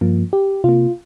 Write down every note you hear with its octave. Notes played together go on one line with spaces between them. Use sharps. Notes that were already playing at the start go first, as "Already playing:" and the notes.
G2 F3 A#3
G4
C3 A#3 F4